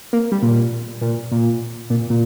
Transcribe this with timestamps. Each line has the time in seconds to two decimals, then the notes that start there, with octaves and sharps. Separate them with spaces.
0.13 A#3
0.32 G3
0.42 A#2
1.01 A#2
1.32 A#2
1.90 A#2
2.10 A#2